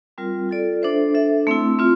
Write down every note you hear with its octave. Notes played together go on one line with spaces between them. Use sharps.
G3 C4 F4 A#4
F4 A4 D5
D4 A4 C5 E5
D4 A4 E5
A3 C4 E4
C4 F4